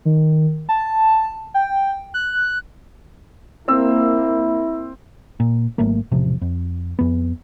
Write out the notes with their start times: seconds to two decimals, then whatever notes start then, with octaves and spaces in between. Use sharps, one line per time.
0.05 D#3
0.69 A5
1.54 G5
2.14 F#6
3.68 A#3 C4 E4 E6
5.40 A#2
5.78 G#1 F#3 A3 A#3
6.11 E1 A1 C3 F3
6.41 F2
6.99 F2 B3